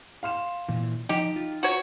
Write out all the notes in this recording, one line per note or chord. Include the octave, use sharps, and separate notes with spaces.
F5 C6 E7
A#2 E3
F3 D#4 G4 D#5
F4
F#4 C#5